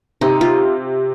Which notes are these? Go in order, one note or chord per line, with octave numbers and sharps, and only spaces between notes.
C3 D#4
F4